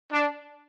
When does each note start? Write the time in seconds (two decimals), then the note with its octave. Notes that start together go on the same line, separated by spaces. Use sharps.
0.12 D4